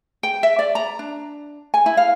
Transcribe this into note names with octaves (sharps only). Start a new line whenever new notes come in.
G5
E5
D5
A#5
D4
G#5
E4
F5